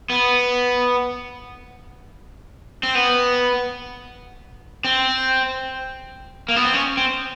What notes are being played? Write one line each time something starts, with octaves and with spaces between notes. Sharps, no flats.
B3
C4
B3
C4
A#3
B3
C4
C#4
C4